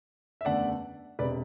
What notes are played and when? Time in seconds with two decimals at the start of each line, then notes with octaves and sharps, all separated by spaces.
0.41 E5
0.45 F#1 E2 D3 A3 D5 F#5
1.19 E1 B4 D5
1.22 C3